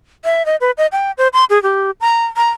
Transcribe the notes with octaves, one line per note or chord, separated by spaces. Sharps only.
E5
D#5
B4
D#5
G5
C5
C6
G#4
G4
A#5
A#5